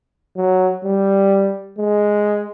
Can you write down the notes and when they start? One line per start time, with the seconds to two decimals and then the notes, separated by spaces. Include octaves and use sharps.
0.37 F#3
0.85 G3
1.79 G#3